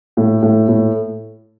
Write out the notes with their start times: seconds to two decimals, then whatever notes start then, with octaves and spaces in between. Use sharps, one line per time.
0.17 A2
0.42 A2
0.68 A2